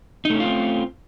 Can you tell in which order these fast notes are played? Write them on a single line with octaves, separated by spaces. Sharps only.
D#4 A3 C#4 F4 C4